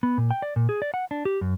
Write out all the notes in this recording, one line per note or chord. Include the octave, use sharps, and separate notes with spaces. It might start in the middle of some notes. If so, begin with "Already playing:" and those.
B3
A#2
G5
D5
A#2
G#4
D5
F#5
D4
G4
F#2